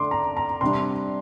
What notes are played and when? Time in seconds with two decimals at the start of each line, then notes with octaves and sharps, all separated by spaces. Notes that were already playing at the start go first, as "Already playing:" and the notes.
Already playing: D3 A3 D4 C6 D6
0.11 A#5
0.37 A#5
0.61 C3 G3 D4 C6